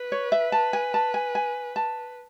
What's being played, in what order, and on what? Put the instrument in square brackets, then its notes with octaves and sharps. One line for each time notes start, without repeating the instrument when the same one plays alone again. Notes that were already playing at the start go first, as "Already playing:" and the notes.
Already playing: [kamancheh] B4
[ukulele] C#5
E5
A5
G#5
A5
G#5
G#5
A5